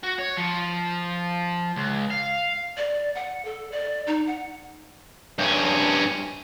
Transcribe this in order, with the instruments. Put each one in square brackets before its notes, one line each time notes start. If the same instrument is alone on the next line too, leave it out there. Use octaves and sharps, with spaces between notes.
[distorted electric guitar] F#4
C#5
F3
C#2
F5
[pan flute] D5
F#5
A4
D5
D#4
F#5
[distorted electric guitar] G2 C#4